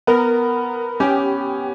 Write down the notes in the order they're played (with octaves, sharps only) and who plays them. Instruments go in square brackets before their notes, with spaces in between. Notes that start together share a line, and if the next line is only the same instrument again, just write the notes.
[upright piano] B3 [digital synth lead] A#4
[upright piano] C#4 [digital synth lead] G4